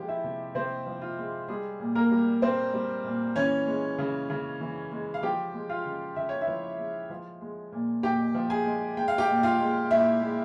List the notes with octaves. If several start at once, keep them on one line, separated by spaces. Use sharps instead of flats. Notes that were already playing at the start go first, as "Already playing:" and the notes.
Already playing: F3 G#3 G4
E4 E5
C3
C3 C4 C5
F3
F4
G#3
G3 G#3 G#4
A#2
A#3 A#4
G3
A#2 C4 C5
G3
A#2
E3 C#4 C#5
G#3
C#3
C#3
E3
G#3
F5
F3 G4 G5
G#3
F4 F5
C#3
C#3 E5
C#5
E4 E5
F3
G#3
F3
G#3
A#2
A#2 G4 G5
F3
G#4 G#5
G#3
G#3 G5
F5
G4 G5
A#2
F4 F5
G#3
A#2 E4 E5
G#3